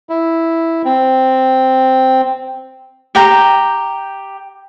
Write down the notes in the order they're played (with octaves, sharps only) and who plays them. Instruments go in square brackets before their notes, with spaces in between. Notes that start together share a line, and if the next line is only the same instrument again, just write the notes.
[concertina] E4
C4
[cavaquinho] G4 G5 A#5